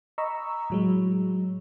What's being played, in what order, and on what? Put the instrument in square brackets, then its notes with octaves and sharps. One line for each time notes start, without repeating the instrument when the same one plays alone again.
[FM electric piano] D#5 A#5 B5 C#6 E6
A2 F#3 G#3